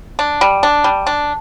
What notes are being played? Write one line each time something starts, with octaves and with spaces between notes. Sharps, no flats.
D4
G3
D4
G3
D4